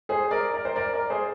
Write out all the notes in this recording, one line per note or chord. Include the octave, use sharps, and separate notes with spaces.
G#4 C5
A#4 D5
A#4 D5
C5
A#4 D5
A#4 D5
G#4 C5